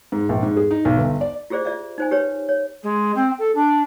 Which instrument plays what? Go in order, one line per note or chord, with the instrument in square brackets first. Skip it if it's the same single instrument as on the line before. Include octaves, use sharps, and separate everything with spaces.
[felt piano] G#2
A#1
G#2
G#4
D#4
B1
G1
D5
[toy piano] F4 G4 G#4 C5 D5
F4 D5 E5
D#4 C5 G#5
G4 B4 C#5
C#5
[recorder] G#3
C4
A4
D4